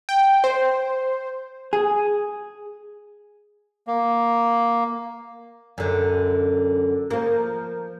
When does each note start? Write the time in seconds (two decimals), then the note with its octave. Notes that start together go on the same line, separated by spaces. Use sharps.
0.09 G5
0.44 C5
1.73 G#4
3.87 A#3
5.78 F#2 D3
7.11 F3 A#3